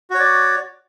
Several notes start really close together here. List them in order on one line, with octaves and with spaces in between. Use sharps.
F#4 C#5 D5